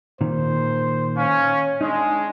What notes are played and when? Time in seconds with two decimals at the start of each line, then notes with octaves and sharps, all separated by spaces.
0.21 A#2 D#3 C5
1.17 C#4 F5
1.81 G#3 D4 D#4